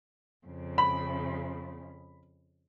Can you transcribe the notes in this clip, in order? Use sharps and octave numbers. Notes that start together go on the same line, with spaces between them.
F2 C#3
B5